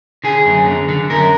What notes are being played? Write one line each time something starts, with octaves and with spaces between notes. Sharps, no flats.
D3 G#4
F#2
D3
D3
F#2 A#4